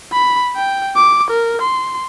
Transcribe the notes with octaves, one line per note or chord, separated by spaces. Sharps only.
B5
G5
D6
A#4
C6